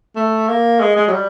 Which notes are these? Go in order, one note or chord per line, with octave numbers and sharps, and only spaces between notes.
A3
A#3
G#3
G#3
F#3
G3